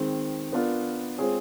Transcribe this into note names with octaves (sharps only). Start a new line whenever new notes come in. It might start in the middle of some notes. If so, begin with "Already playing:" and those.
Already playing: D#3 G#3 C4
B3 D4 F4 A#4
G#3 C4 F4 G#4 C#5